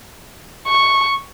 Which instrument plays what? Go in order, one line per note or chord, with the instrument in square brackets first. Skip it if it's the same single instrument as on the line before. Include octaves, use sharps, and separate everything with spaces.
[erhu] C#6